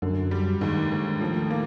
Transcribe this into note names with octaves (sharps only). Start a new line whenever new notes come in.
F#2 D3
G3
D#2 G#2
D#2
A2 F3
A#3